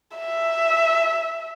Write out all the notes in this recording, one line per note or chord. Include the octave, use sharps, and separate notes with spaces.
E5